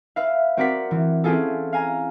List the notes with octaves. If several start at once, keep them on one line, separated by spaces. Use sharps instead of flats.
B4 E5 F5
C4 F#4 A#4 D5 F#5 B6
E3
C4 C#4 E4 F4 G#4 A4
F5 G#5 A#5